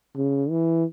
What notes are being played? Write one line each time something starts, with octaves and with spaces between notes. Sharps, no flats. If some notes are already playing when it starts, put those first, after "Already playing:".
C#3
E3